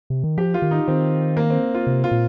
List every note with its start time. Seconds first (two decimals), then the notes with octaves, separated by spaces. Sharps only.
0.10 C3
0.24 D#3
0.38 F3 G4
0.54 F4
0.62 D#3
0.71 D#4
0.88 D#3 C4
1.37 A#3
1.50 C4
1.74 F4
1.87 C3
2.04 F4
2.12 A#2